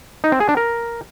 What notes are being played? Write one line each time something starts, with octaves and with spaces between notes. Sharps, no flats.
D#4
C4
G#4
D4
A#4